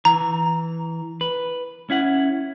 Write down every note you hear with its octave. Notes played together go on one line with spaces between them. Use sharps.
E3 A#5
B4
C#4 E4 F#5